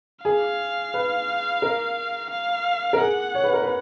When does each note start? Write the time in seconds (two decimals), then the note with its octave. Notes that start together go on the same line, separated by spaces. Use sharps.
0.25 G#4 F5
0.94 B4
1.62 A#4
2.31 F5
2.93 A#4
3.00 G#4 F#5
3.35 C#5
3.44 B4
3.53 A#4
3.62 B4